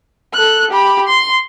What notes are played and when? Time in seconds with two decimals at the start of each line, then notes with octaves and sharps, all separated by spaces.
0.34 A4 F#6
0.71 G4 B5
1.08 C6